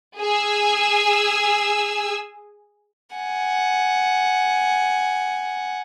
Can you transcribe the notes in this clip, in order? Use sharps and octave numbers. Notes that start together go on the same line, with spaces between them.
G#4 G#5 E6
F#5 G#5